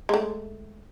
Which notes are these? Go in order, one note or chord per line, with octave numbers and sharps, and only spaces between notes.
G#3 A3